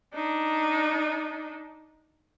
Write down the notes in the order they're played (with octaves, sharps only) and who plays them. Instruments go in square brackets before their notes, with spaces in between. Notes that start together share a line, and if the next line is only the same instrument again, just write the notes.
[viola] D4 D#4